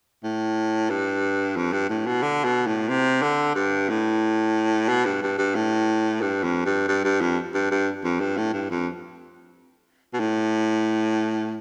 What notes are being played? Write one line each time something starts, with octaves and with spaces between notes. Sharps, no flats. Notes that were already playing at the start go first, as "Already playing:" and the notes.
A2
G2
F2
G2
A2
B2
D3
B2
A2
C3
D3
G2
A2
B2
G2
G2
G2
A2
G2
F2
G2
G2
G2
F2
G2
G2
F2
G2
A2
G2
F2
B2
A2